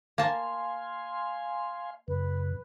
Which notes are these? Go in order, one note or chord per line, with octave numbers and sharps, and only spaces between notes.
A#3 F5 G#5 A5 C6
F#2 C#3 B4